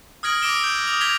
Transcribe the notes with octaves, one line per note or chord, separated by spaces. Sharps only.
D#6 F6 G#6 A#6 D7 F#7
D6 E6 A#6 D7 E7 G7
G6
D#6 F7
G#6 A#6 B6 F7 G7